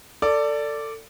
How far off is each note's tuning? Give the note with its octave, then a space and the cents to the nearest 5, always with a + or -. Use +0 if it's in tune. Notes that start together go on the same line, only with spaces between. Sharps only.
A4 +25 D5 -5